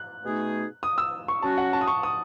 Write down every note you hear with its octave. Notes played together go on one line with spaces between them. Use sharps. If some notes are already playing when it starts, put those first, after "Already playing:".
Already playing: F#6
B2 A3 D#4 G#4
D#6
E6
C#6
F#3 C#4 F#4 A5
F#5
A5
D#6
C#6
D#6